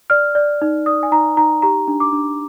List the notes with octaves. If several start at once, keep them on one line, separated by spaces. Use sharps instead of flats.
D5 F6
D5
D#4
D5 D#6
G#5
D#4 A#5
D#4 A#5
G4 A#5
D4
D6
D4